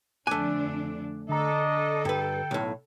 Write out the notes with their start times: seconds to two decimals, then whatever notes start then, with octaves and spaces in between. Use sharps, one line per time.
0.27 F2 D3 A3 D4 G#5 D6 F#6
1.29 D3 D4 A4 D#5 A#5
1.69 A4
2.05 G2 B4 G5
2.51 B1 A2